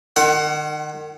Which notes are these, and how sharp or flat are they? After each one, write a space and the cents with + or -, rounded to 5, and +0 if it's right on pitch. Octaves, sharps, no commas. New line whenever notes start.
D#3 -35 F#5 +20